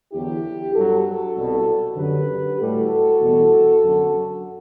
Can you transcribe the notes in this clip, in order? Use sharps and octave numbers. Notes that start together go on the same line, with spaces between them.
E2 D3 F#3 E4 G4
G2 F#3 F#4 A4
C2 B2 G3
F#2 D3 F#3 G4 B4
A2 G3 F#4 A4
E2 B2 G3
F#2 D3 F#3